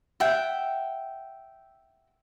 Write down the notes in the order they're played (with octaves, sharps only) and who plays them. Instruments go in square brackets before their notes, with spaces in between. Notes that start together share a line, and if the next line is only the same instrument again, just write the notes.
[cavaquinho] E5 F#5 G5